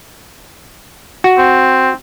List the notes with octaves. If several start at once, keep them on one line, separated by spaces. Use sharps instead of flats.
F#4
C4